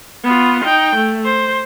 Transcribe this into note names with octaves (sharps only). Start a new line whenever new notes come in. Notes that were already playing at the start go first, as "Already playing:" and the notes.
B3 F4
D#4 G5
A3
C5